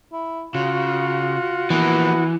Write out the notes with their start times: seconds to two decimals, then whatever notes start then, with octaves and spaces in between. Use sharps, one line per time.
0.13 E4
0.55 C#3 F4 F#4
1.70 E3 F3 A#3 B3